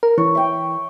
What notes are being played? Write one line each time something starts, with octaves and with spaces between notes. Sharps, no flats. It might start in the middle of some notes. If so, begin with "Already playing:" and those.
A#4
E3 C#5
E5 G5